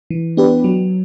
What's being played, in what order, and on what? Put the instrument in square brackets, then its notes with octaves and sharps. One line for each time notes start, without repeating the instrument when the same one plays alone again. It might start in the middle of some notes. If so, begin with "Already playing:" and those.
[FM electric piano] E3
B3 D4 G4 B4
F#3